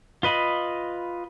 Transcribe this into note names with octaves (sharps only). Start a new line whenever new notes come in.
F4 B4 D#5 B5